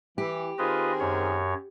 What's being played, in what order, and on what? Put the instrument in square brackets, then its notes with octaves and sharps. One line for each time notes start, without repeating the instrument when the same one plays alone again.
[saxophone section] E3 [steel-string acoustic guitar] G4
[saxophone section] D#3 C4 G#4 [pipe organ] F4 B4 D#5
[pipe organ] F#2 C#5